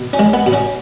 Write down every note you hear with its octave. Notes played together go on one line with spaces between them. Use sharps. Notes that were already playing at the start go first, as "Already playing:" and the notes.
Already playing: B2
C#4
G#3
B3
B2
C#4